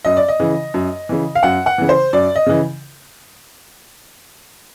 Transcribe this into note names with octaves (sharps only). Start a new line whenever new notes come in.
F#2 D#5
D5
D#5
C#3 E3
F#2
C#3 E3
F5
F#2 F#5
F#5
C#3 E3
C5
F#2 D5
D#5
C#3 E3